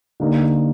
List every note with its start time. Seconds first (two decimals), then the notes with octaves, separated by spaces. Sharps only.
0.20 D3 G3 A#3 D#4